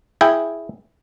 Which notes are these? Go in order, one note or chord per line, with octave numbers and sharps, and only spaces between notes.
E4 G#4 G5